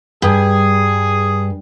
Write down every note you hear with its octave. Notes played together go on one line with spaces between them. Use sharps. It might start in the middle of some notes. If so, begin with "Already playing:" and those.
G2 G#4